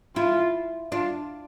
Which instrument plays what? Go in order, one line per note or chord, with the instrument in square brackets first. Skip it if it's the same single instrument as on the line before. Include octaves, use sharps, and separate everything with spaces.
[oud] E4 [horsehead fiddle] F4
[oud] D4 [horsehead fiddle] F4